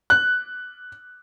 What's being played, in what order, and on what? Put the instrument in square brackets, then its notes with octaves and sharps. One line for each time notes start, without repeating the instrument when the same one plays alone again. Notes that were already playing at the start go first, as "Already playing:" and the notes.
[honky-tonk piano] F#6